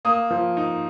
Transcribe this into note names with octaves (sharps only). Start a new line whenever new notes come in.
A#3 D#6
F3
D#4